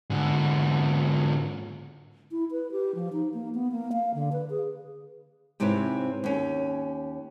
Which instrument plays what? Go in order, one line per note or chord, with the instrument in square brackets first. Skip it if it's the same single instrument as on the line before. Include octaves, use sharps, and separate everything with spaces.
[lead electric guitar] G#2 D3
[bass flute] E4
B4
G4
F3
D#4
A#3
B3
A#3
F5
D3
B4
G#4
[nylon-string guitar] G#2 C3 C4 E4 B4 C#5
D#2 C#4